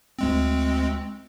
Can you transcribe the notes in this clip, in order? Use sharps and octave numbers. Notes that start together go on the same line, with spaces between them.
D2 G#3 C4